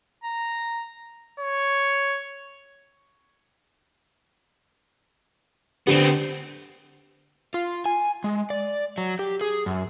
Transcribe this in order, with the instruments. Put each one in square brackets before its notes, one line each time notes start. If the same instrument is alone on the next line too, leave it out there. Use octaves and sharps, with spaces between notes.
[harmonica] A#5
[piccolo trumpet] C#5
[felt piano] D3 G4 [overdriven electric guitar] B3 C4
[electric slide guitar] F4
G#5
G#3
D5
F#3
G4
G#4
F#2